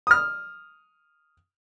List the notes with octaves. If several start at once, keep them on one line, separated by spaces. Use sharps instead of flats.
D#6 F6